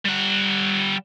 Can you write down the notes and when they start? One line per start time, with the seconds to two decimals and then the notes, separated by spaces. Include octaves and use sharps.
0.05 G3 F#5